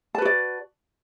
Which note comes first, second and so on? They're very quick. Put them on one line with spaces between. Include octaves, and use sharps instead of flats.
A5 B4 F#4 D5